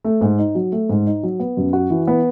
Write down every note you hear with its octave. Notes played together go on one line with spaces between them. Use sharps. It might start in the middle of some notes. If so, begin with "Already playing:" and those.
A3
G#2
D#4
F#3
A3
G#2
D#4
F#3
B3
F#2
F#4
E3
B3